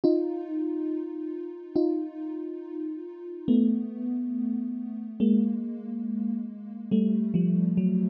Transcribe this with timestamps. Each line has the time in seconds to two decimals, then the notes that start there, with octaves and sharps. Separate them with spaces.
0.04 D#4 F4
1.76 D#4 F4
3.48 A3 B3
5.20 G#3 A#3
6.91 G3 A3
7.34 F3 G3
7.77 F#3